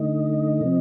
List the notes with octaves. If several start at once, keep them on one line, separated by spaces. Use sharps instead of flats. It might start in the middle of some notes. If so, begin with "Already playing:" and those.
Already playing: D3 A3 D#4 D#5
C3 F3 C4